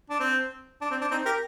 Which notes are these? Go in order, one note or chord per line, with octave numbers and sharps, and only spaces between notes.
D4
C4
D4
C4
D4
C4 D#4
G4 A#4